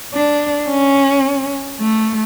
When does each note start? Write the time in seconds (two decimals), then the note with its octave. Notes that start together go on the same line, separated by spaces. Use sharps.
0.13 D4
0.69 C#4
1.80 A3